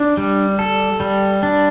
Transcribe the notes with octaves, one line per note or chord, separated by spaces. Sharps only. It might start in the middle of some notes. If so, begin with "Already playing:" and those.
Already playing: D4
G3
A4
G3
D4